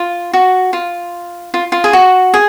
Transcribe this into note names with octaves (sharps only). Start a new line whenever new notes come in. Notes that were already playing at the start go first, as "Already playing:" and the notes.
Already playing: F4
F#4
F4
F4
F4
G#4
F#4
G#4